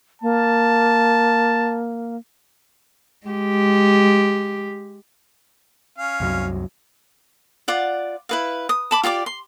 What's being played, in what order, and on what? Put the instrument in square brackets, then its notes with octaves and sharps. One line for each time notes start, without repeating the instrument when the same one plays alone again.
[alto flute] A#3 [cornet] A5
[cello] G#3 G4
[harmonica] C#4 F5
[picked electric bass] C2 F#2 F#3
[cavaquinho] F4 D5 F#5
E4 B4 F5
D#6
A5 B5 D6
F4 G4 D5 D6
C6